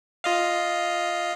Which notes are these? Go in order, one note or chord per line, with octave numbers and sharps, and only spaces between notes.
F4 D#5 F5